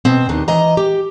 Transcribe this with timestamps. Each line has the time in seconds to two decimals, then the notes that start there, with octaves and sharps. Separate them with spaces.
0.05 B2 C4
0.29 D#2 D4 D#4
0.48 E3 D#5 A#5
0.77 G4